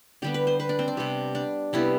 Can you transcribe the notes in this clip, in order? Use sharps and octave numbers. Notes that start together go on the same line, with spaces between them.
D3 G3 B3 G4
B4
C5
B4
D4
C4
D4
C3 G3 B3 G4
D4
C3 G3 B3 E4